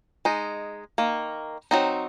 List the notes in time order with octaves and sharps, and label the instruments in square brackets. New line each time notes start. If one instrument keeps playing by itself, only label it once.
[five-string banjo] G#3 D#4
D#3 A#3
F#3 C4 D#4